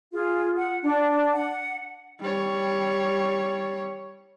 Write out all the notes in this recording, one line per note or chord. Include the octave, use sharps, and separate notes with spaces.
F4 G#4
F#5
D4
F#5
G3 C#5